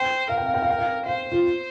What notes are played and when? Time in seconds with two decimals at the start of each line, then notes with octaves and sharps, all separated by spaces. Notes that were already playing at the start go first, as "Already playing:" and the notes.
Already playing: C5 G5
0.29 A#4 F5
0.37 G5
0.46 F5
0.54 G5
0.62 F5
0.70 G5
0.78 F5
1.06 C5 F5
1.32 F4